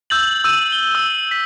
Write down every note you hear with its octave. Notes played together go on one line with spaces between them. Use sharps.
E6 G6 A6 F#7
E6 G6 D#7 E7
G7
E6
B6